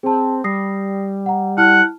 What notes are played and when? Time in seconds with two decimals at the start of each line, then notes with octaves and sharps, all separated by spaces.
0.03 C4 G#4 A5
0.44 G3 D#6 A#6 C7
1.26 F#5 A#5
1.57 E4 F#5 A5 F6